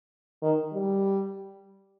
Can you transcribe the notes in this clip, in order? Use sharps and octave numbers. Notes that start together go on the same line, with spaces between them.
D#3
G3